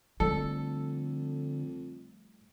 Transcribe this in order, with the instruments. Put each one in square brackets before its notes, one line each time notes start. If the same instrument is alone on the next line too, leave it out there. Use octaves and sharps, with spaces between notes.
[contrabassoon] F2 [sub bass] D3 [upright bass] G3 A3 [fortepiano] A4